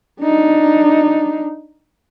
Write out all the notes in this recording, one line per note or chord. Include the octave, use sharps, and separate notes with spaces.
D4 D#4